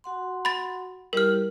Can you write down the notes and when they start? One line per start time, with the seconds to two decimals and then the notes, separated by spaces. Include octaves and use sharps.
0.04 F#4 F#5 C6
0.45 B5 A6
1.13 G3 E4 G4 A#4 F6